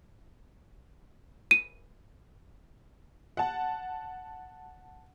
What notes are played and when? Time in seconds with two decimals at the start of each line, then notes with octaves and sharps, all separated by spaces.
1.51 D#7
3.37 F#5 A5